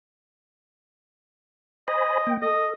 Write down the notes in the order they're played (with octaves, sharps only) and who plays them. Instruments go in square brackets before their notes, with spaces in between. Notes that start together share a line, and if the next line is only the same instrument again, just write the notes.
[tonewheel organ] C5 G#5 B5 [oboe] D#5
[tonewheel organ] A#3 G5
[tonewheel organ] A4 [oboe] D#5